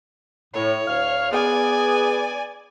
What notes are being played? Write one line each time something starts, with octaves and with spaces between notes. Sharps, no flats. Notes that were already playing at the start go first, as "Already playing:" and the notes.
A2 C#5
D2 F5 F6
B3 G#4 D5 G#5